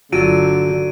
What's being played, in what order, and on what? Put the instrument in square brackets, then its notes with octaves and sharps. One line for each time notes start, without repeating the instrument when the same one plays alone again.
[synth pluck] G1 F4 E6 [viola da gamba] D3 [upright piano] F#3 [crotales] D7 D#7